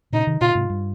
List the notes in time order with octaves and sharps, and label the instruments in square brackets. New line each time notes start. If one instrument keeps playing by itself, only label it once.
[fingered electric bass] A#2 C#3 [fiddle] D#4
[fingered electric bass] C3 D#3
[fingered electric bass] A#2 C#3 [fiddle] F4
[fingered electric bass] G#2 C3
G2